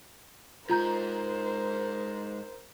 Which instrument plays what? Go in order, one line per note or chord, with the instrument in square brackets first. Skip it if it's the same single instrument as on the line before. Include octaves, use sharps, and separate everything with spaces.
[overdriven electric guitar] G#2 [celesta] F4 A#5 G6 [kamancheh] A#4 C5